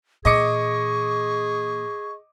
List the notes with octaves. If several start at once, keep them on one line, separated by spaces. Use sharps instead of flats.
A#2 E3 G#4 D#5 C#6 D6 C#7